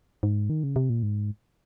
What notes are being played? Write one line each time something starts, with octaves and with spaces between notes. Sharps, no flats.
G#2
D#3
C#3
C3
A#2
G#2